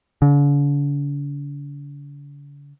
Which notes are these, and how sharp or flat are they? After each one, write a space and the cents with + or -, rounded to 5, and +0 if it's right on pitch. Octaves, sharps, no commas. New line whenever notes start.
D3 -45